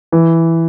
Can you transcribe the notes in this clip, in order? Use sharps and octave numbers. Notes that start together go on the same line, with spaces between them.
E3